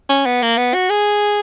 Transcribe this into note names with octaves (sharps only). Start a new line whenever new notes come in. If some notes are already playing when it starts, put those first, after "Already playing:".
C#4
B3
A#3
B3
F#4
G#4